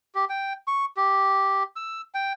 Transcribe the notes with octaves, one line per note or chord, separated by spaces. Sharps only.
G4
G5
C#6
G4
E6
G5